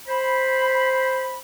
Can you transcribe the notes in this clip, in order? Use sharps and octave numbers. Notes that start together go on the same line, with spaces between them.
C5 B5